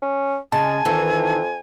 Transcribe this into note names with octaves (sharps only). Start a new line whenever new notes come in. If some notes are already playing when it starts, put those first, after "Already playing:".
C#4
C#3 G#3 G#5 A5
F2 D#3 E3